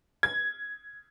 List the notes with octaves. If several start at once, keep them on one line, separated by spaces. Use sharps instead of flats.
G#6